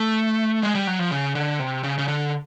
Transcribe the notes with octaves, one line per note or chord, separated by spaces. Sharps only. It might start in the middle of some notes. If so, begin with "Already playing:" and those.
Already playing: A3
G#3
G3
F#3
F3
C#3
D3
C3
C#3
C#3
D3